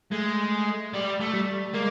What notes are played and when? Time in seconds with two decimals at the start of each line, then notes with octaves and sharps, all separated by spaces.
0.12 G#3 A3
0.94 G3
1.20 A3
1.33 G3
1.74 G#3 A#3